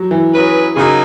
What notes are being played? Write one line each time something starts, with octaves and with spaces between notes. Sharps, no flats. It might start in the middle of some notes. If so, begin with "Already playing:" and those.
Already playing: F#3
E3
F#3 C#4 G#4 B4
C#3 F#3 A#3 D#4 G#4